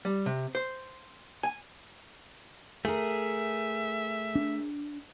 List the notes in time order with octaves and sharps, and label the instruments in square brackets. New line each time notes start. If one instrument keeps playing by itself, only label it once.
[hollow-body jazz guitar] G3
C3
C5
G#5
[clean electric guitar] A3 [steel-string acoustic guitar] G#4 A#4 [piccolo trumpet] E5
[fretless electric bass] D4